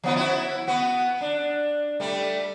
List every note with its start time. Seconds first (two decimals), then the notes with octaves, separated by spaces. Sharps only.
0.03 F3 B3 D#4
0.16 E4 F#4
0.67 B3 F#4
1.21 D4
2.00 G3 A3